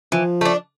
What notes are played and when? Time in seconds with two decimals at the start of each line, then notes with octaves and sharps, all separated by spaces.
0.12 E3 F3
0.41 A3 D4